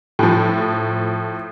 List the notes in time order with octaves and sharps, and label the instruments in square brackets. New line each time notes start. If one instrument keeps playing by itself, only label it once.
[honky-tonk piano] A2 F3